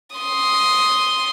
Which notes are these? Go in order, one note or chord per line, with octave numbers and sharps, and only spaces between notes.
C6 D#6